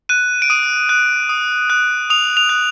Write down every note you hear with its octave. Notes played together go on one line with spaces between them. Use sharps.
F#6 D#7
D7
D#6 D#7
F#6
D#6
F#6
D#6 F7
F7
F#6